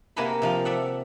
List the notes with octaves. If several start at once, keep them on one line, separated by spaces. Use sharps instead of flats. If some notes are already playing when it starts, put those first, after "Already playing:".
C3 A#3 F#5 G#5 A5 B5
C3 F3 F5
A4 D5 E5 F#5